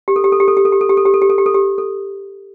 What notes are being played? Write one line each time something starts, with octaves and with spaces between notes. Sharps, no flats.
G4
A4
G4
A4
G4
A4
G4
A4
G4
A4
G4
A4
G4
A4
G4
A4
G4
A4
G4
A4